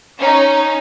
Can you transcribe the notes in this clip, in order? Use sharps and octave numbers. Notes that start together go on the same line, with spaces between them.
C#4 D#4